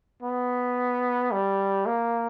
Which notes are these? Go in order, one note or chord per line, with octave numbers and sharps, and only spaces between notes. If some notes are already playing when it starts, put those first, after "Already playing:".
B3
G3
A#3